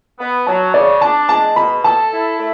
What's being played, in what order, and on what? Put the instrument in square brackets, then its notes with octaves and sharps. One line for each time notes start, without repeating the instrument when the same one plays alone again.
[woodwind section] B3
[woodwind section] F#3 [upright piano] A5
[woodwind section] C#3 [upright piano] D5
[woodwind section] D4 [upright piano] A5
[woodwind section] G#3 [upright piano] A5
[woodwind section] B2 [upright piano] B5
[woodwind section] A4 [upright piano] A5
[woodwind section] E4
A3